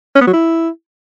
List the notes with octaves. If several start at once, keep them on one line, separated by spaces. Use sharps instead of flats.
C#4
B3
F#3
E4